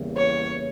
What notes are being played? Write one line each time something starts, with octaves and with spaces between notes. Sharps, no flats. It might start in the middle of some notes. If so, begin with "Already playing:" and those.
Already playing: E2 C#3 E3 G3 A#3
C#5